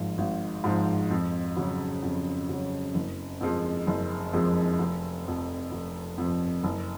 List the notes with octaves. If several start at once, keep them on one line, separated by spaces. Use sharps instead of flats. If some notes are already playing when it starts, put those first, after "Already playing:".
Already playing: G#1 G#2 F3
G#1
G#2 F3
F2
C#3 F#3
F2
C#3 F#3
F#1
F2 F3 G#3
F#1
F2 F3 G#3
F1
F2 F3
F1
F2 F3
F#1